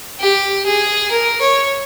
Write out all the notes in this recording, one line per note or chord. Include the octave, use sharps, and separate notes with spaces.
G4
G#4
A#4
C#5